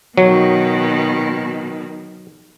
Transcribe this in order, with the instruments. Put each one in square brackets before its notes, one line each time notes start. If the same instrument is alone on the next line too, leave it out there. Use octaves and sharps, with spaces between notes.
[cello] B2 D#3 [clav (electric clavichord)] F#3